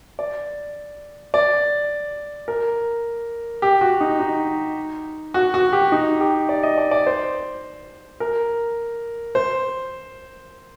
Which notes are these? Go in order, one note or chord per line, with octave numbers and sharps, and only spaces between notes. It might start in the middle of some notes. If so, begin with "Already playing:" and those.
D5
D5
A#4
G4
F#4
D#4
D#4
F#4
F#4
G4
D#4
G4
D5
D#5
D5
D5
C5
A#4
C5